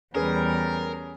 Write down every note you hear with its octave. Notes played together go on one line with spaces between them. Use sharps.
E2 G3 C#4 G#4 A#4 B4